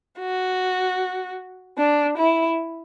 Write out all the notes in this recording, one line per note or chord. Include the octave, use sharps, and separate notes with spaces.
F#4
D4
E4